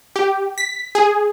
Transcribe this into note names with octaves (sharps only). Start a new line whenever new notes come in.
G4
B6
G#4